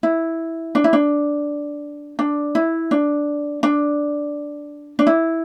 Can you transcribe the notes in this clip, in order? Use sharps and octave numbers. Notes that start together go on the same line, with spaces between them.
E4
D4
E4
D4
D4
E4
D4
D4
D4
E4